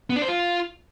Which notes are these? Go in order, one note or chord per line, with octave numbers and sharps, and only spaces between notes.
B3
D4
C5
F4